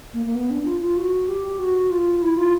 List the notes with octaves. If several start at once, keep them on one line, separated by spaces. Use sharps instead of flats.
A#3
A#3
B3
D4
F4
F4
F#4
G4
F#4
F4
E4
F4